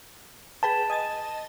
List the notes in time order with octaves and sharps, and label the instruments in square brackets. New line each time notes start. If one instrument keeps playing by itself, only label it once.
[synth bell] G#4 B4 G5 [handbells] A5
[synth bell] D#5 G#5 A6